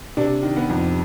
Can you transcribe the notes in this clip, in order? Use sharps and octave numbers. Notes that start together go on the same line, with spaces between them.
C3 D4
D#3
B3
F2